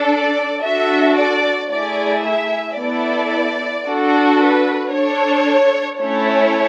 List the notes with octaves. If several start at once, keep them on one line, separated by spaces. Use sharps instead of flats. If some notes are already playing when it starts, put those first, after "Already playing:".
Already playing: D4 A4
D5
D4 F#4 A4 E5
D5
A3 E4 G#4 D5
E5
B3 E4 A4 D5
D4 F#4 A4
B4
D4 A4 C#5
A3 C#4 E4 A4 C#5